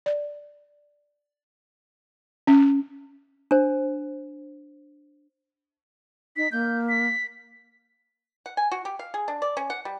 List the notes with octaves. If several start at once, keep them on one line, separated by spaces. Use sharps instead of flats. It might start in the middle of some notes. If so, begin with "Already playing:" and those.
D5
C#4
D4 C5
D#4 B6
A#3 G6
B6
F#5
G#5
F#4
G4
F5
G#4
D4
D5
C#4
F#5
G3